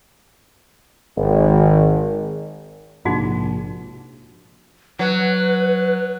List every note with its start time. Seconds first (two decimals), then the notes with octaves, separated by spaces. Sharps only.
1.17 G#1
3.05 A#1 G#2 C3 D#4 F#4 G#4
4.99 F#3 B4